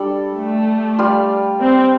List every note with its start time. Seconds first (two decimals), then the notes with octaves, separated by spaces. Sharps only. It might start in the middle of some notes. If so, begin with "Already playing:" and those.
Already playing: G3 D4 A4 D5
0.35 A3
0.99 G3 F4 D5 F5
1.60 C4